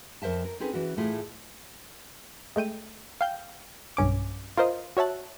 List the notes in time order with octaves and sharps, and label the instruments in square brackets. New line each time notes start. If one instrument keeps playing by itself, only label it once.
[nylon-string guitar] F2 A#4 C5 E5 A5
A#4
C4 C#4 D#4 G#4 A4 B4
E3 C#4 F#4
A2 A3 E4 F4 G#4
[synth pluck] G#3 A3 G5 D#7
F5 G5 G6
B1 G2 C#4 D6
F4 A#4 C5 D#5
F#4 C#5 E5 A5 F#6